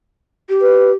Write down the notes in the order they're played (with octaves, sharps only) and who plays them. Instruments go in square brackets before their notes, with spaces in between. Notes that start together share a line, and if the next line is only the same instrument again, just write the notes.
[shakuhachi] G4
[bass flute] B4